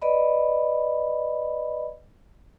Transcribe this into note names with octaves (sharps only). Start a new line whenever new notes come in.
B4 D5 D#5 B5